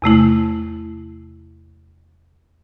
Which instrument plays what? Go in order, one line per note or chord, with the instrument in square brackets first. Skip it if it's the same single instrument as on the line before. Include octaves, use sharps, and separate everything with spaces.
[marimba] E2 C3 A3 E4